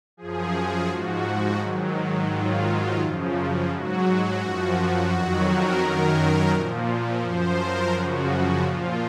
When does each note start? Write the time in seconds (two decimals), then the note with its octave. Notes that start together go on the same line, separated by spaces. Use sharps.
0.17 F#2 F3 G#4
0.88 G#2 F3 F#4
1.58 G#2 D#3 F#3
2.28 G#2 D#3 F#3 F4
2.99 F#2 C#3 F3
3.69 G#2 F#3 F#4
4.40 F#2 F3 F#4
5.10 F2 D#3 F#3 F#4
5.45 A#4
5.81 F#2 D#3 F#3 A#4
6.52 A#2 F3
7.21 F#2 F3 C5
7.57 A#4
7.92 F#2 C#3 F3 F#4
8.62 A#2 F3 F4